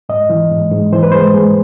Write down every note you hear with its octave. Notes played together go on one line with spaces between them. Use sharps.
G#2 D#5
E3
G#2
G#2
E3 C5
B4
G#3 C5
G#3